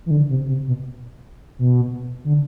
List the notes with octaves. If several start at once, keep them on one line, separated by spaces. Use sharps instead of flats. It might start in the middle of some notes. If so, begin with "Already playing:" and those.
E3
D3
C3
C3
B2
B2
D3